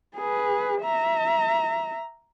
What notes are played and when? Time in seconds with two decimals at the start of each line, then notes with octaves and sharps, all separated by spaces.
0.16 G#4 B4
0.81 E5 A#5